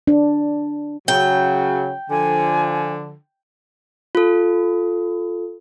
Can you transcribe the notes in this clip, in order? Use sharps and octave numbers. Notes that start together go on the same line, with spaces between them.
D4
C#3 F#3 G5
D3 F3 G#5
F4 A4